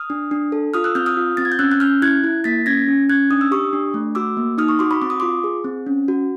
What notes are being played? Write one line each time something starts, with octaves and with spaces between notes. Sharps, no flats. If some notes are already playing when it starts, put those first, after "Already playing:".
Already playing: D#6 F6
D4
D4
A4
F4 D#6 F6
E6 F#6
C4 F6 G6
D#6 F6
F4
C4 A6
G#6
G6
C#4 E6 F#6
F#6
C#4 F6 G6
E4 F#6 G#6
E4
A#3 A6 B6
C#4 G#6 A#6
C#4
C#4 F#6 G#6
D4 D#6
E6
G4 C#6 D#6
D4
A3
F#4 D6 E6
A#3
D#4 D#6 F6
C#6 D#6
F#4 C6 D6
B5 C#6
C4 D6
D#6
F4 C6 D6
G#4
C4
C#4
F#4